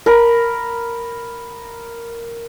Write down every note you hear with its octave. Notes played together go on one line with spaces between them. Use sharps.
A#4 B5